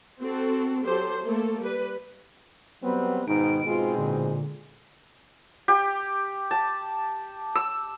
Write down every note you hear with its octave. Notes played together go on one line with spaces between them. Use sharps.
C4 F#4 A4
F#3 G4 A4 C5
A3 A#3 A4
G3 B4
F#3 G3 B3 C4 B4
G#2 B2 D#3 D#4 D7
G#2 B2 G#3 C4 F4
A#2 D3
G4
A5
E6